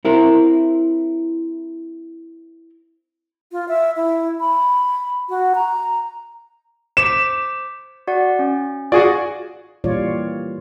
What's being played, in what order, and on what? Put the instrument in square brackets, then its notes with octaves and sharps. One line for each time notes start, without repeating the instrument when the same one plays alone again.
[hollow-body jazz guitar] C4 E4 A#4
[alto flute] F4
E5
E4
B5
F#4
A#5
[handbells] C5 D6 B6 [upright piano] E7
[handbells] F#4 D5 F#5
C#4
[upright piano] F4 [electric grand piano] F#4 G#4 D5 [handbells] C#6
[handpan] A#2 E3 G3 F4 C#5 D5